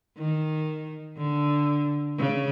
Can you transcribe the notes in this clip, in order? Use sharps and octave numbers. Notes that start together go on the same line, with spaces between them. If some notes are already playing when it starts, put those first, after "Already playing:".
D#3
D3
C#3